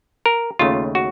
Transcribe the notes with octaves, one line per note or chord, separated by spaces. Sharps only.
A#4
D#2 C#3 A3 F4
F#4